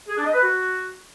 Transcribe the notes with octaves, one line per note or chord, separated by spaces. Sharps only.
G#4
D4
D#5
B4
F#4